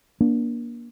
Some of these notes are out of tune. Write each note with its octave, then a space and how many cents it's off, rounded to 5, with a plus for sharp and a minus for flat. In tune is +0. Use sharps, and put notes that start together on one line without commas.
A#3 +25 D4 -15